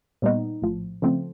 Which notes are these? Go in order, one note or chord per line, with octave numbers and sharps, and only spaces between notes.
A#2 G3 B3 D#4
A#1 A2 F3
C#3 F3 A3 C4